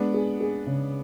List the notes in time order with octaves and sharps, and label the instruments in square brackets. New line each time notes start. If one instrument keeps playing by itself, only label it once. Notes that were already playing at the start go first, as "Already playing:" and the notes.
Already playing: [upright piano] G#3 [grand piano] B3 D4
[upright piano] G#4
G#4
C#3